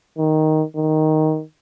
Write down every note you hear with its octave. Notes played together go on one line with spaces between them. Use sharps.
D#3
D#3